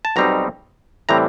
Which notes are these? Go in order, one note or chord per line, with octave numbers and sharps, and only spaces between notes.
A5
B1 B2 G3 C4 D#4 A#5
A2 E3 G3 C4 A#5